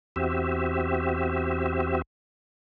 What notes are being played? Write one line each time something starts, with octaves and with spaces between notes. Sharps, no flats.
E2 C4 F#4 G4 E5